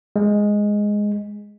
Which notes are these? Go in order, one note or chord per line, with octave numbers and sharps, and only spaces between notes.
G#3